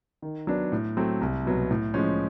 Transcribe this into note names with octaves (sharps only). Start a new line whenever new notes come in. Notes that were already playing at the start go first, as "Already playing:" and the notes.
D#3
F#3 B3 D4
A2
F#3 A3 C4
C2
B2 F#3 B3
A2
F3 G#3 C#4